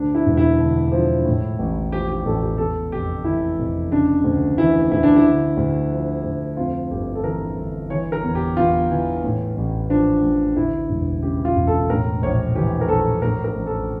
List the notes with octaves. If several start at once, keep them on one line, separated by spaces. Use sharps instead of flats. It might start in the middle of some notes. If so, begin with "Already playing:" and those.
Already playing: D2 D4
E4
E1
E4
D3
F3
A2
A1
F3 G4
G4
A1 A4
G4
E2 A4
F1 G4
E3 E4
F1
C#3 D4
D2
E3 E4
D2 E4
D4
E4
D3
D2
F3
D2
F2 F4
G1 G4
A4
E3 A#4
G1
E3 C#5
A#4
E2
G4
E2 F4
E3
A2
A1
F3 D4
A1
D2 E4
E1
C#3 G4
F4
E1
A4
A2 A#4
A#1 C#5
E3 G4
A#4
A#1 A4
A2 A#4
A#4
A1
A4